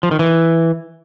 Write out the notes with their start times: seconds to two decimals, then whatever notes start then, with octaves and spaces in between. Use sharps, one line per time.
0.03 F3
0.11 D#3
0.19 E3